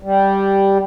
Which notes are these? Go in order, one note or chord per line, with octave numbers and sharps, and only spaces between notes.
G3